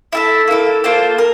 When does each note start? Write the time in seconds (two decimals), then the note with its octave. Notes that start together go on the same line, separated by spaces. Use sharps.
0.12 E4 A4 E5
0.48 A#3 E4 A4
0.84 A#3 F4 A4 C5
1.18 A#4